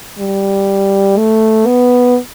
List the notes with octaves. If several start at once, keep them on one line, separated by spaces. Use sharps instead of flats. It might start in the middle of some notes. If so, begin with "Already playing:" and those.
G3
A3
B3